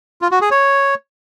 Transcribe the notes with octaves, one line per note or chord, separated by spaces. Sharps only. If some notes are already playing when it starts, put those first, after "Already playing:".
F4
F#4
G#4
C#5